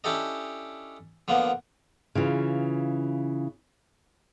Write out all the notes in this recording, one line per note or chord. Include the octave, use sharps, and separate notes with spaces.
C#4 D4 E4 G4 A4 D#5
D3 F3 A#3 B3
C#3 E3 F4